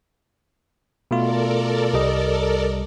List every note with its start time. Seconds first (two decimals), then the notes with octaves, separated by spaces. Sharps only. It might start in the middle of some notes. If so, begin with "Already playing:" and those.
1.11 B2 A3 F4 A4 A#4 D5
1.93 C2 G3 D#5